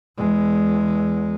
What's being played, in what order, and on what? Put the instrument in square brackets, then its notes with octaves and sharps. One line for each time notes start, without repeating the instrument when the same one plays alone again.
[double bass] E2 G#3